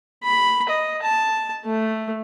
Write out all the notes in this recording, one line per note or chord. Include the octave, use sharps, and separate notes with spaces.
B5
D#5
A5
A3